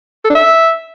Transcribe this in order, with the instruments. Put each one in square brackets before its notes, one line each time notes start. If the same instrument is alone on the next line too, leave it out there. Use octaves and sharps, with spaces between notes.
[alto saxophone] A4
D4
E5